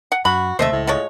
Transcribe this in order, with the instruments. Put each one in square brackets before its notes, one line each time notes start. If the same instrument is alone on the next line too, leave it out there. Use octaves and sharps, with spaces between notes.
[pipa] F#5
[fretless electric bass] F#2 [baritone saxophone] F#4 [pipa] B5
[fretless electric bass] D#2 C3 [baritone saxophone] A3 [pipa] C5 D#5 E5
[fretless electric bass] C#2 [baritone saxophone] A2
[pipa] F3 G#3 C#5